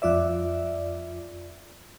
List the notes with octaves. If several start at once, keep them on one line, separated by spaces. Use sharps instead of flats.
F2 F4 D5 E5